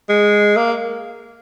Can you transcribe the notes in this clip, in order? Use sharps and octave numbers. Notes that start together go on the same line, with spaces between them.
G#3
A#3